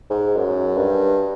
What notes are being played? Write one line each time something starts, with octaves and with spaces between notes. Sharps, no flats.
G#2
F#2
G2